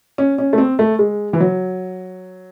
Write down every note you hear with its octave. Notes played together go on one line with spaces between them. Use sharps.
C#4
C#4
A3
C4
A3
G#3
E3
F#3